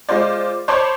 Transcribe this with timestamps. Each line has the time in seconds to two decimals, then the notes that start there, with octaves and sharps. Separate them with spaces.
0.09 G#3 F4 C5 D5
0.68 C5 C#5 A5 B5 C6 D6